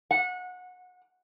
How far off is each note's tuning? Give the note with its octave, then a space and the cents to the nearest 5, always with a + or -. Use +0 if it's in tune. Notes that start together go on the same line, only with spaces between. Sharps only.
F#5 -25